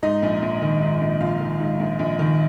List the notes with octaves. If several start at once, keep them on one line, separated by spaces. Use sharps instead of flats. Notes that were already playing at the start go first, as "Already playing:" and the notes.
G#2 D#4 D#5
A#1
A#1
D#3
G#2
A#1
A#1 F4 F5
D#3
G#2
A#1
A#1
D#3